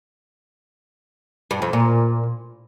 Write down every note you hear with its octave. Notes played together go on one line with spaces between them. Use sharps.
G2
F2
A#2